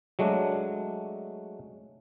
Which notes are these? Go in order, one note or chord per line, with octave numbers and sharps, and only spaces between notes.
F#3 G#3 A3 D4